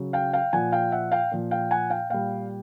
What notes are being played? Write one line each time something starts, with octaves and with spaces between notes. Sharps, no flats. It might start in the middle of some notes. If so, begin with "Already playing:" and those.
Already playing: C#3 F#3
F5 G5
F5 G5
A#2 F3 F#5 G#5
F5 G5
E5 F#5
F5 G5
A#2 F3
F5 G5
F#5 G#5
F5 G5
A#2 G3 F5 G5